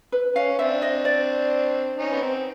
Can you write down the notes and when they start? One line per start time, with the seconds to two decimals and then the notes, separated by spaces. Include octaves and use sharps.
0.12 B4
0.35 C#4 F5
0.58 C4 D4 E5
0.82 D#5
1.05 D5
1.98 C#4 D#4
2.11 B3
2.21 C4